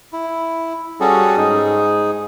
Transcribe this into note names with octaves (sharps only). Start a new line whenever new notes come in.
E4
G3 C#4 F#4 G#4 A4
G#2 D#4 G#4